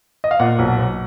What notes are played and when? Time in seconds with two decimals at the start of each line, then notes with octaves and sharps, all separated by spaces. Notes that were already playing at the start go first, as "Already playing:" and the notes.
0.24 D#5
0.31 F5
0.40 A#2 F#5
0.59 B1
0.78 B1